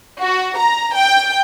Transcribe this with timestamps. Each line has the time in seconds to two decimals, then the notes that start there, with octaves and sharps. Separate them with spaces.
0.20 F#4
0.57 A#5
0.95 G5